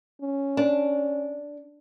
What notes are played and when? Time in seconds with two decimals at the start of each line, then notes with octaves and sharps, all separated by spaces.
0.22 C#4
0.57 D4